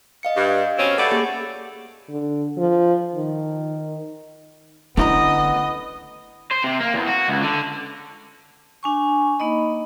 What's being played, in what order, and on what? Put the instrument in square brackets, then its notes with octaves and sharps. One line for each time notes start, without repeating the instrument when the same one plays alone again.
[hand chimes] D#5 F5 C#7
[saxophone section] G2
B2 C4 C#4
[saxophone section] A3 D5 [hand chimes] F#5 B5 G6
[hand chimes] A#3 G4 G#4
[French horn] D3
F3
D#3
[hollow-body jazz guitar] D3 A3 A#5 [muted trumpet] B3 [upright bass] C#4 E4 [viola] D#5
[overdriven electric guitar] C5
C3
A#3
E2
F#4
C#2
D3
[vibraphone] D4 G#5 C#6
A#3 D#4 D#5 B5